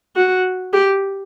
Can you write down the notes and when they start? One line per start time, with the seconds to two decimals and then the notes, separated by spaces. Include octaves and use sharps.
0.16 F#4
0.73 G4